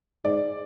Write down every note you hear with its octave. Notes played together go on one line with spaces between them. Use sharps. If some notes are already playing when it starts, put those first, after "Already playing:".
G#2 D5